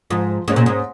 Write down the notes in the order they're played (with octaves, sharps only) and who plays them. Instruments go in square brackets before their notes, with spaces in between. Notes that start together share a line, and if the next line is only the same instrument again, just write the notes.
[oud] G#2 [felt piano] F3
[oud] G#2 [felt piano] A#3 C#4 G#4 C#5
[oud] A#2
G#2